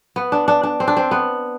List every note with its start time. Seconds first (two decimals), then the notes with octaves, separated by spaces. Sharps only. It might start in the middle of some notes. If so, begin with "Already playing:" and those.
0.16 B3
0.32 D4
0.48 D4
0.63 D4
0.80 C4
0.88 D4
0.97 C4
1.11 B3